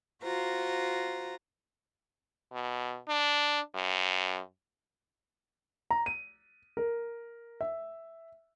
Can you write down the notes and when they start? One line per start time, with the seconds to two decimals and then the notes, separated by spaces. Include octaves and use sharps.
0.23 F4 F#4 C5 A#5
2.53 B2
3.09 D4
3.75 F#2
5.91 A#5
6.06 D#7
6.77 A#4
7.61 E5